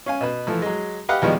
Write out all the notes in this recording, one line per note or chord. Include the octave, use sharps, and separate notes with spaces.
C#4 F5 G#5
B2 B4
E3 F3 A3
F#3 G#3
G4 B4 D#5 F5 F#5
D#2 B2 F3 G3 G#3 B3